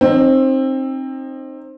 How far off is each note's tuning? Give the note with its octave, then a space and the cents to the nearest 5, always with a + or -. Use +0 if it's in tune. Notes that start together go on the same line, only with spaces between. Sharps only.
C4 +20 D#4 -20